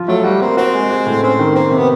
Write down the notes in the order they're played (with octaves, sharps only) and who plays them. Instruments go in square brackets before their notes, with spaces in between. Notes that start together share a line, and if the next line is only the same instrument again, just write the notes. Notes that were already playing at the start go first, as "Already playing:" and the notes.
Already playing: [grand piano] F3 F4
[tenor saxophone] F#3 [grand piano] A3
[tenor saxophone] G3 [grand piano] F#4
[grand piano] A#3 [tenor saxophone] C4
[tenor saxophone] C4 [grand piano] F#4
[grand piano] G#3
G#3
A2
[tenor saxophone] C4 [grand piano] C#4
[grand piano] D#3
[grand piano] A#3 [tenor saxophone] C4
[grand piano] C3
[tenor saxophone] B3